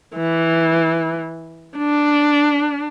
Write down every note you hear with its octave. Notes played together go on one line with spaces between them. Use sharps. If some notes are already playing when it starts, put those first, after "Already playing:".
E3
D4